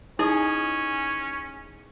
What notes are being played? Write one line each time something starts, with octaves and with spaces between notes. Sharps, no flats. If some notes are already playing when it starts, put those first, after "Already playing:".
C#4 D#4 E4 G#4 A4 D#5 G#5